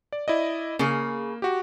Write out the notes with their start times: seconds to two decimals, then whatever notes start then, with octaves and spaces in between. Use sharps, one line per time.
0.13 D5
0.28 E4 D5 D#5
0.79 C#3 A#3 G#4
1.42 F#4 G4